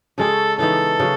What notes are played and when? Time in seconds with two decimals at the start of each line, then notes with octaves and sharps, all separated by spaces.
0.18 C#3 G#3 C#4 G#4 A4
0.59 C#3 E3 B3 D#4 A4
1.00 C#3 F#3